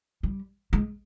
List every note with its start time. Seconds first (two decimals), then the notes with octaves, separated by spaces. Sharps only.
0.23 G3
0.73 G#3